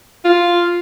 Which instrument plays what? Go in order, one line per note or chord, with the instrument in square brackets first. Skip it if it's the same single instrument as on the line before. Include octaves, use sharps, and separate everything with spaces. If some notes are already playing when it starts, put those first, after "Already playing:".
[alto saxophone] F4